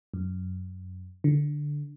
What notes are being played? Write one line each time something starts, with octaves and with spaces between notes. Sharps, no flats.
F#2
D3